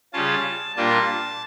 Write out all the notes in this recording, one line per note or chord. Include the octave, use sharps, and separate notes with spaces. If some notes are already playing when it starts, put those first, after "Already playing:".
C#3 G3 C#4 F4 A5
A#2 G3 A#3 D4 F4 A5